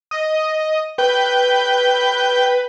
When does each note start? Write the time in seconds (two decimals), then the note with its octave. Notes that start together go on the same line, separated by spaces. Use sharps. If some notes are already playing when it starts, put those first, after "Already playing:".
0.11 D#5
0.98 B4 G5